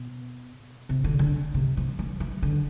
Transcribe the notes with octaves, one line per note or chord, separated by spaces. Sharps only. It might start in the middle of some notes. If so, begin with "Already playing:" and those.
Already playing: B2
C3
D3
D3
C3
E3
E3
E3
D3